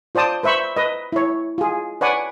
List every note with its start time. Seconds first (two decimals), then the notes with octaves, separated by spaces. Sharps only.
0.15 F4 C5 D5 A5 D#6
0.43 B4 C5 E5 B5 C#6
0.76 B4 D#5
1.12 E4 C#5
1.58 F4 G#4
2.01 B4 C#5 D5 F#5 G#5